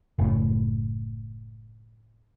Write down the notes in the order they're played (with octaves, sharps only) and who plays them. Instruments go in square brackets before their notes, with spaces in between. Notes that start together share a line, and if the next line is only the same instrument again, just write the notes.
[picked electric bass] F#1 A2